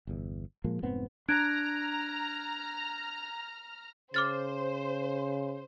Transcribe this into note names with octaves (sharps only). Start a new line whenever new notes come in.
G1 E2
A#2 F3 G#3 A#3
F1 G#2 B3 C4
D4 A#5 F6 F#6 G#6 D7
C#3 C5 D6 F6 A6